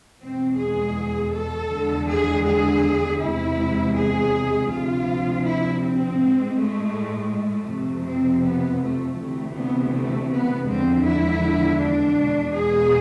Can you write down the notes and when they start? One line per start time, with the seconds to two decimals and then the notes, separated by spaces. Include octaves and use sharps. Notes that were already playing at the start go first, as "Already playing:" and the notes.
0.21 E2 B2 G#3 C4
0.58 G#4
1.33 A4
1.70 E2 D3 G#3
2.08 G#4
2.45 G#4
3.20 E2 C3 G#3 E4
3.95 G#4
4.69 D2 C3 F3 F4
5.44 E4
5.82 C4
6.19 A2 G#3
6.56 A3
7.31 A3
7.68 F2 C3 F3
8.06 C4
8.43 B3
8.81 A3
9.18 D2 C3 E3 A3
9.56 B3
9.93 A3
10.31 B3
10.68 E2 D3 F3 G#3 C4
11.05 E4
11.80 D4
12.17 E2 B2 G#3
12.55 G#4